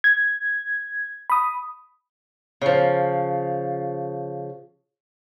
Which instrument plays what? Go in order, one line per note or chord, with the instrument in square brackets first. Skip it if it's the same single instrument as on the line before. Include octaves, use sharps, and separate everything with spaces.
[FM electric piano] G#6
B5 D#6
[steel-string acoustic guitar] C#3 F3